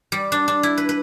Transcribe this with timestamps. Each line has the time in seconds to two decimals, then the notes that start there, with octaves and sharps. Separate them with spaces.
0.12 G3
0.32 D4
0.48 D4
0.63 E4
0.78 B4
0.89 B4